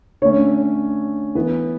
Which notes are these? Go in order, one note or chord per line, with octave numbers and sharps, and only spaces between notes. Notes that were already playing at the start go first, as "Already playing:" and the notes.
D3 A3 C#4 C#5
E3 B3 B4